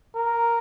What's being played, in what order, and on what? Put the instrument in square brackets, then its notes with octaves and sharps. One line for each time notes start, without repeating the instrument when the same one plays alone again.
[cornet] A#4